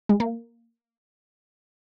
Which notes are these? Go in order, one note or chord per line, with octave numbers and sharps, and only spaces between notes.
G#3
A#3